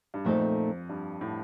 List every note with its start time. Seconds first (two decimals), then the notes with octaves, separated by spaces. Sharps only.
0.14 G2
0.25 F2 A#2 A3 C4 D#4 A4
0.89 G2
1.21 A2